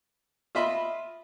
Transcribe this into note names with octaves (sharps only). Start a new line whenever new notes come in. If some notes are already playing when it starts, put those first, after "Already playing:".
F4 D#5 E5 B5 C6